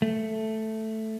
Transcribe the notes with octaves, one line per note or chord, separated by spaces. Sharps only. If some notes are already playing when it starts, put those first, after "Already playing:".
A3